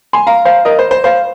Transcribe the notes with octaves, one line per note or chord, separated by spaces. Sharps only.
G#5 C6
F5 A#5
C5 F5
A#4 D#5
C5
C5
C5 F5